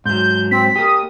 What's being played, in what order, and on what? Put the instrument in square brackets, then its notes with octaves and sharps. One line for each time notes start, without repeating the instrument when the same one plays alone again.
[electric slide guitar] G#2 F#3 [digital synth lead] G6
[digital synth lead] C4 [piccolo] B6
[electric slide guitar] A#3 G4 [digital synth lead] D#6